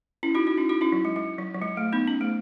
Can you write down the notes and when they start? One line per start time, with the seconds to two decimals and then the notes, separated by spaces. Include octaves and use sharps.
0.23 C#4 E4
0.35 D#4 F#4
0.47 D#4 F#4
0.57 C#4 E4
0.69 D#4 F#4
0.81 C#4 E4
0.92 F#3
1.05 G#3
1.16 G#3
1.38 F#3
1.54 F#3
1.62 G#3
1.77 A3
1.92 B3 D#4
2.08 C#4
2.21 A3